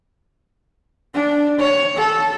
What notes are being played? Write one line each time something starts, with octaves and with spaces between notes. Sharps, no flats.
D4
C#5
A4